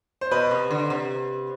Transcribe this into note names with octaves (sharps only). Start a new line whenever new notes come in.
C5
B2 B4
C3
D3
C3